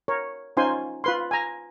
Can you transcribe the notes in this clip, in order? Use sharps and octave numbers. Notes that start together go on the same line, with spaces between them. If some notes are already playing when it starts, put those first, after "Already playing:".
A#4 C#5
C#4 D#4 F4 C5 G#5 C6
F4 B4 C6
G#5 A#5